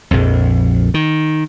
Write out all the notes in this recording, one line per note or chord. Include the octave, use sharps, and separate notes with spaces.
A#1 F2
D#3